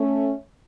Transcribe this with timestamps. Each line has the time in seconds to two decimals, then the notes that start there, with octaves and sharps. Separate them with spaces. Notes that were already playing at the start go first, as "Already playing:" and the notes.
Already playing: A3 C#4